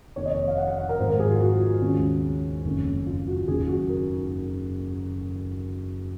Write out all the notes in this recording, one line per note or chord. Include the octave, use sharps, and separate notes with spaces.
F1 F2 C3 D#3 A#3 C#5
D#5
C#5
F5
F#5
F#5
F#5
A#4
G#1 G#2 F3 G#3 C5
A#4
G#4
F4
F#4
D#2 C#3 G#3 C#4
F#1 F2 D#3 A#3 C#4
F4
F#4
F#1 F#2 D#3 A#3 D#4 G#4
F#4
A#4